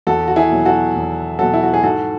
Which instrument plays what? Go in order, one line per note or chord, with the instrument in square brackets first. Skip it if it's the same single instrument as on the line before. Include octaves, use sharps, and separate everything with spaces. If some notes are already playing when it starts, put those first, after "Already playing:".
[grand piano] E2 F#4 A4
F#4
E4 G#4
B2 F#3
F#4 A4
E2
B2 F#3 F#4 A4
E4
F#4
G#4
G#2 F#4 A4